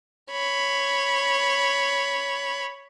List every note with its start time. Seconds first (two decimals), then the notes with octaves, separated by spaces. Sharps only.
0.31 C#5 B5